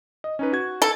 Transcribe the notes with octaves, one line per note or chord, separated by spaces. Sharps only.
D#5
C#4 D#4 B4
F#4 G#6
A4